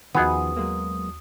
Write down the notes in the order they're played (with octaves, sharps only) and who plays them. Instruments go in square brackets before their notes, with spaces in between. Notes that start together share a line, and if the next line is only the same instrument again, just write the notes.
[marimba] D#2 F#4 F#5 [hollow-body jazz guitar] D#3 F3 [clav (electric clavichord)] B3 G#4 [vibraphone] D#6
[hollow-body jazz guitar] F#3 G#3 A#3